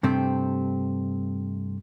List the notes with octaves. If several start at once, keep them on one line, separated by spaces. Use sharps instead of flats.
G2 C3 A3 C4